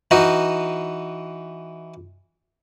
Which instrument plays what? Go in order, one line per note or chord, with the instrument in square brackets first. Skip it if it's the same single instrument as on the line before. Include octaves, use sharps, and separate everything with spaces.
[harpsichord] E3 D#4 F#4